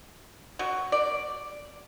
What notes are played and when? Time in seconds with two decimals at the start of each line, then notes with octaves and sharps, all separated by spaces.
0.59 F#3
0.92 D5